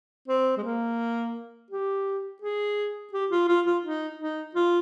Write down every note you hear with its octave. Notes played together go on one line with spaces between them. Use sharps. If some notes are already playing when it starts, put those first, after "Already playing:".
C4
G#3
A#3
G4
G#4
G4
F4
F4
F4
D#4
D#4
F4